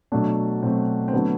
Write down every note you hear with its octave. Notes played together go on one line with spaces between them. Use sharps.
B2 F#3 A3 D4
B2 F#3 A3 C4
C4
D3 F#3 A3 B3